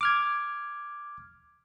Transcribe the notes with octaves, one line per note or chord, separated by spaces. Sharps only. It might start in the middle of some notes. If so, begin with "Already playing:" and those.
D6 F6 G#6